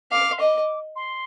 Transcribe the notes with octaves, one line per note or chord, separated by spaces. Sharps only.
F5 D6
C6
D#5 D6
C6